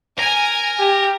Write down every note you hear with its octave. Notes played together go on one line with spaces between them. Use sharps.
A#4 G#5
G4